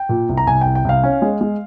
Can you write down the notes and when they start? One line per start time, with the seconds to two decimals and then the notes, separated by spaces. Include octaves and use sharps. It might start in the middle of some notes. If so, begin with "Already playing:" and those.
Already playing: G5
0.09 A#2
0.29 C2
0.37 A#5
0.47 C2 G#5
0.61 C2 G5
0.75 G5
0.85 C2 F5
1.03 C#4
1.22 G#3
1.41 G#3